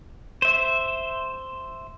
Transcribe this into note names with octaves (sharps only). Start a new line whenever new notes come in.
C5 E5